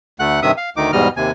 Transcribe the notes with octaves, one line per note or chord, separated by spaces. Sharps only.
D2 A3 F#5 F#6
G2 C3 D#3 E5 D#6
F5
D2 D#3 D#4 D6
E2 G#2 B2 G3 D#5 F6
D#2 C3 G#5